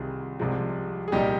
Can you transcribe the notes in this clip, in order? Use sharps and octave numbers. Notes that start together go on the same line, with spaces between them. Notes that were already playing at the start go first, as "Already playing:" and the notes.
Already playing: C2 C3 D#3 F4 G#4
C2 C3 F3 G#3
G#4
C2 A#2 G3 D#4 G4